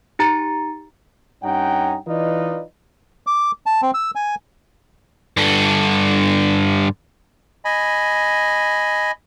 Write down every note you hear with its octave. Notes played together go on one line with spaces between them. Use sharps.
D#4 G4 A#5 A6 C#7
G2 C#4 D#4 F#5 G5
E3 D#4 F4 B4 D5 D#5
D6
A5
C4
E6
G#5
G2 D3
D#5 G#5 B5